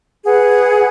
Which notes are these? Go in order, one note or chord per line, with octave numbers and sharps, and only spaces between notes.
G#4 B4 F#5